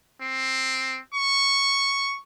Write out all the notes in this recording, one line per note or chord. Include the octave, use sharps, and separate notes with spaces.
C4
C#6